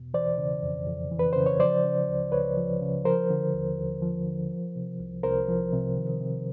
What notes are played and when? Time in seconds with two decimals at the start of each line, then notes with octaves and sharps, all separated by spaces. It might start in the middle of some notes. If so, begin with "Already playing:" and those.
Already playing: E2 B2
0.14 E3 C5 D5
0.38 C#3
0.63 F2
0.87 F2
1.11 E3
1.19 B4
1.33 C#3 C5
1.46 C#5
1.59 F3 C5 D5
1.84 C#3
2.08 C#2
2.32 C#2 B4 C#5
2.57 F3
2.81 C#3
3.05 F3 A#4 C5
3.30 D3
3.54 D#2
3.78 D#2
4.02 F3
4.26 D3
4.51 F3
4.76 C3
5.00 C2
5.23 C2 A#4 C5
5.48 F3
5.73 C3
5.96 D#3
6.21 C3